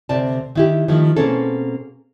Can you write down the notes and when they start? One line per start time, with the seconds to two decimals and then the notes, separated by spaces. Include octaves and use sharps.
0.09 D2 C3 D5 A5
0.55 D#3 E4 G4
0.88 D#3 F3 A3 E4
1.17 B2 A#3 C4 C#4 G#4 A4